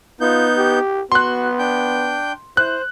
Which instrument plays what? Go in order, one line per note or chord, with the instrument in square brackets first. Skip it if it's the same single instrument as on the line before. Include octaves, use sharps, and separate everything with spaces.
[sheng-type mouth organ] B3 D#4 G6 [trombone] F4
[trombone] G4
[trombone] B3 [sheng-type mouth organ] F#4 [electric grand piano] C6 F#6
[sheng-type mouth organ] D4 G5 G6
[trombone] E4 [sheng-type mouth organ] C5 [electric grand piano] F#6